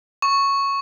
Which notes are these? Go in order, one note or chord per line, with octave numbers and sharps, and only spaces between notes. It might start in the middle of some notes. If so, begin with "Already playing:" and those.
C#6